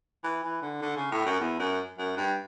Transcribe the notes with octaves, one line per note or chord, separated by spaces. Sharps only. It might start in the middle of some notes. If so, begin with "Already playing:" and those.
E3
E3
D3
D3
C#3
A2
F#2
E2
F#2
F#2
G2